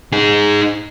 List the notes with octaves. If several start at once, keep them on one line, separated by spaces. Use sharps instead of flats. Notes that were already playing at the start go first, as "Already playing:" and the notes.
D#4 G#4